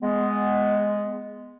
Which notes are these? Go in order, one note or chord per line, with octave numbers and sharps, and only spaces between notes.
G#3 B3